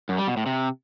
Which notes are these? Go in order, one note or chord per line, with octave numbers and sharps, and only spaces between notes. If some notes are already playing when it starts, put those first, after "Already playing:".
F#2
G3
B2
A2
C3